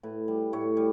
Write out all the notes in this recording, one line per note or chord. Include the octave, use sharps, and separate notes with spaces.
A2 B4
G3
A2 C#5
G3